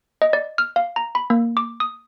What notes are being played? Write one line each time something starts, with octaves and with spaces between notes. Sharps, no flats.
D#5
D5
F6
F5
A#5
B5
A#3
D6
D#6